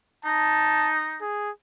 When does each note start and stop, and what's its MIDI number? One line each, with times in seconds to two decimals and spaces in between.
0.25 1.20 63
0.25 0.92 81
1.21 1.50 68